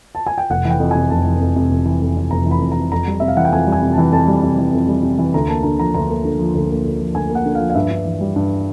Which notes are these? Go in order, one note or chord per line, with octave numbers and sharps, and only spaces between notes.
A5
G#5
G5
F1 F#5
E3
G5
F2
C3 G#5
F1 A5
E3
F2
C3
F1
E3
F2
C3
F1 A#5
E3
B5
F2
C3 A#5
F2 A#5
G3
C3 E5
F5
E3 F#5
G5
F2 G#5
G3
G#5
C3
E3 A5
F2 A5
G3
C3
E3
F2
G3
C3
E3
D2 A#5
A#3 A5
D3 A#5
F3 A#5
D2 A#5
A#3
D3
F3
D2
A#3
D3
F3
D2 G#5
A#3
F#5
D3
F3 F5
F5
G2 E5
G2
E3
G3
G2